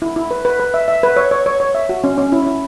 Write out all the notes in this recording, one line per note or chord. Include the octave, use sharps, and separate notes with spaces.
E4
E4
B4
B4
B4
E5
E5
B4
C#5
C#5
C#5
C#5
E5
F#4
C#4
C#4
E4
E4